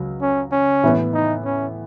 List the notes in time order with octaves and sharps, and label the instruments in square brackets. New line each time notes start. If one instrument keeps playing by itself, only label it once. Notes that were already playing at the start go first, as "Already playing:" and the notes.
Already playing: [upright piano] C#2 F#3
[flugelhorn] C#4
C#4
[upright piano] A2 E3 B3
[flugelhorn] D#4
C#4